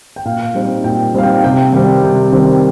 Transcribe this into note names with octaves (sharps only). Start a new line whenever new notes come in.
G5
A#2 F5
G3 C4 D#4
A#2 G5
G3 C4 D#4 F5
G5
C3 G5
D#3 G3 C4 G5
C3
D#3 G3 C4